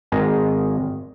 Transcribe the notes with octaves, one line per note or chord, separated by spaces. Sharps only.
G#1 G#2 D#3 G#3 D#5